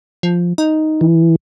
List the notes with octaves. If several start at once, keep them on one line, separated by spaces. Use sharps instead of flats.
F3
D#4
E3